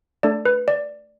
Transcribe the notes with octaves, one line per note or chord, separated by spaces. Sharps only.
A3 D4 A4 D5
B4
D5